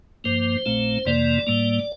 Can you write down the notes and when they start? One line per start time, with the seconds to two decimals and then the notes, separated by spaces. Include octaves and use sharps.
0.24 G2 F3 A#3 C5
0.66 A#1 A#2 A3 C4
1.05 F2 C3 E3 A#3 D5
1.47 A2 G3 A#3